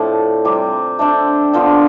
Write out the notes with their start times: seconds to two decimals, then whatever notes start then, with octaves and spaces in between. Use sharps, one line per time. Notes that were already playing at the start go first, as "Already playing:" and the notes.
Already playing: A2 F3 A3 C4 D4 A4 C5
0.45 C3 G3 C4 G4
0.99 A3 D4 A4 C5
1.53 D3 F3 B3 F4